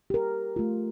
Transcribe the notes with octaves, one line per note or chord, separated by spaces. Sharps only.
G4 A#4
A3 F4